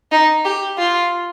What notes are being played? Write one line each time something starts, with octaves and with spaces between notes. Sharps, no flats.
D#4
G4
F4